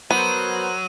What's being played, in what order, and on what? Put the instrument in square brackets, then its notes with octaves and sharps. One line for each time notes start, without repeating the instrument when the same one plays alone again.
[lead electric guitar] F#3 [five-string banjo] B3 [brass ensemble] F#4 A#4 C5 [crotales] D#7